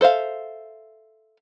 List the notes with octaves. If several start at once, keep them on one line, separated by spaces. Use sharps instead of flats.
A4 C5 E5 F5